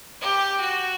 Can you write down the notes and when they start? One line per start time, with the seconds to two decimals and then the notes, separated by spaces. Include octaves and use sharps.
0.21 G4
0.61 F#4